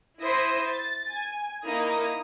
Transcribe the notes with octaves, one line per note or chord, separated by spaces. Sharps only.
E4 C5 E5 D#6 A#6
A6
G#5
A#3 D#4 E4 A#5 D#6